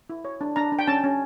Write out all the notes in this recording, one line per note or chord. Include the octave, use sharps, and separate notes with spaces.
E4
C#5
D4
D4 A#5
D4
G5
C#4 A5
C#4